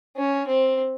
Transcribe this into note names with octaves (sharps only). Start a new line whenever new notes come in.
C#4
C4